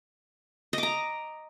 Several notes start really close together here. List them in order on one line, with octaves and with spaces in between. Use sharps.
D#5 D6 A#5